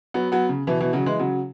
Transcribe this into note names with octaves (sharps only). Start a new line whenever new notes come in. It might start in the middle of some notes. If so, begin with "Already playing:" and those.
F#3 B3
F#3 B3
C#3
B2 E3
B2 E3
C#3 F#3
E3 G#3
C#3 F#3